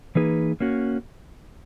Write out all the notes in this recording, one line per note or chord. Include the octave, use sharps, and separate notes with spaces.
E3 A#3 D#4 G#4 B4
A#3 C#4 F#4